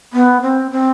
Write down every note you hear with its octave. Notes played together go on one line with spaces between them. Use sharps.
B3
C4
C4